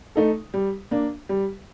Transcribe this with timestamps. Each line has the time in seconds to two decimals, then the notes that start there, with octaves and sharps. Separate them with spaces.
0.16 A3 D#4 A4
0.54 G3
0.91 A#3 D4
1.29 G3